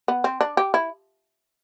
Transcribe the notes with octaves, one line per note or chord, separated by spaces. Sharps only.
B3
C4
D4
G4
E4